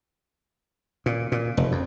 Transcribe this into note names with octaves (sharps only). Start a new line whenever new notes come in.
A#2
A#2
F1
F2